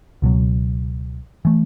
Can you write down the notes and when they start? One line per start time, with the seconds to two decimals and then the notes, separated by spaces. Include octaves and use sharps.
0.22 C#2 B2 F#3
1.45 E3 A3